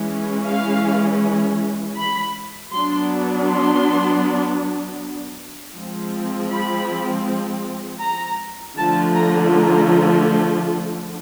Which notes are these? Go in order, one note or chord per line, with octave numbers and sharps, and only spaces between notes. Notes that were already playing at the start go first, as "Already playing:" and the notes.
Already playing: E3 G#3 C#4
F5
B5
F#3 B3 D4 C6
C6
F3 G#3 C4
B5
A#5
D3 F3 A3 A5
A#5
A#5